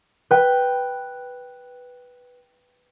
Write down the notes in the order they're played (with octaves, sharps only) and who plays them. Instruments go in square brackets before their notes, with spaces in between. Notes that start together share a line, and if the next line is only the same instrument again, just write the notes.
[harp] B4 G5